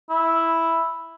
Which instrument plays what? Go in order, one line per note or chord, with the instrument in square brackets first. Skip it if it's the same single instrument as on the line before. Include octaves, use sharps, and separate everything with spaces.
[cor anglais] E4